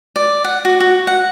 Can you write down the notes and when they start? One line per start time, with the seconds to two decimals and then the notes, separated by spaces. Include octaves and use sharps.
0.16 D5
0.44 F#5
0.65 F#4
0.80 F#4
1.07 F#5